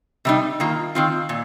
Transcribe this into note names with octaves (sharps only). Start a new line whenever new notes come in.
C3 G3 D#4
D#3 A#3 F4
D#3 C4 F4
A#2